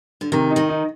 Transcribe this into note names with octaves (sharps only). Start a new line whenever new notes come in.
D3
C3 D#3
D#4
D#3
D#4